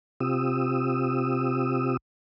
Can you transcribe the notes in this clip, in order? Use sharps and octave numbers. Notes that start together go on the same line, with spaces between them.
C3 C4 F4 G4 D#6 E6